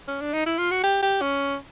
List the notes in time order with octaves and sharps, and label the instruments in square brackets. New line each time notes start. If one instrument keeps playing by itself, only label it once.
[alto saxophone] C#4
D4
D#4
E4
F4
F#4
G4
G4
C#4